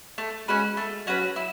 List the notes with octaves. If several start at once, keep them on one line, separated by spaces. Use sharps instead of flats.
A3
G#3 C#4 F#4 B4
A3
F#3 C#4 F#4 B4
E4